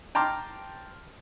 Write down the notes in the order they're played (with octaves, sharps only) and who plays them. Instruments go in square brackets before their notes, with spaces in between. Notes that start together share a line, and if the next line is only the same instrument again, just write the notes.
[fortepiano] G5 A5 A#5 C6 D6 F6